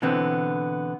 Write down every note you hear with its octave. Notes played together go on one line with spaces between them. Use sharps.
B2 D3 E3 B3 C4